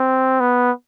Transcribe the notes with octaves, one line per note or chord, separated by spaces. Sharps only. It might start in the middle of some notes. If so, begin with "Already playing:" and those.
Already playing: C4
B3